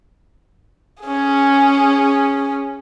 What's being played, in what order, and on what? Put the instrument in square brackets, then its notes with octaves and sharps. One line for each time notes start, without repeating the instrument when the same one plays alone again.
[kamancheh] C#4 G#4